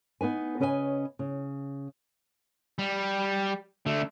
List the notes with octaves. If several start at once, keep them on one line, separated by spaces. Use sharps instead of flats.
B3 D#4 B4 G#5
C#3 C#4 B4 D#5 E5 G#5
C#3
G3
D3 A3